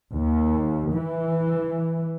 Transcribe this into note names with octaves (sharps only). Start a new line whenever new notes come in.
D#2
E3